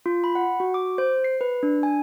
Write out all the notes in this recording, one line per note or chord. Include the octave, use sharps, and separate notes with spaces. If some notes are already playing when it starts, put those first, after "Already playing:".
F4
B5
F#5
F#4
D6
C5
C7
B4
D4
G#5